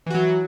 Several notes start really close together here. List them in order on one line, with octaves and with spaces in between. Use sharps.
E3 F#4 F#3